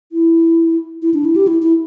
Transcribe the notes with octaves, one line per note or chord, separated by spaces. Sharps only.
E4
E4
D4
E4
G4
E4
E4